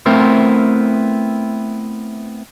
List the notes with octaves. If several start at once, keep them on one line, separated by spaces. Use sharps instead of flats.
A3 B3 C4 E4 A#4 C5